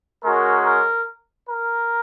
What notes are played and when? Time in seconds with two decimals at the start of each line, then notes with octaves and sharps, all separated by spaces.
0.24 G#3 C#4 F#4 A#4
0.64 A#4
1.47 A#4